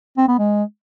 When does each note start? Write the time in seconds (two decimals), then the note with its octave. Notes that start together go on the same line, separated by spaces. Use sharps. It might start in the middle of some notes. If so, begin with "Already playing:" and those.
0.17 C4
0.28 B3
0.38 G#3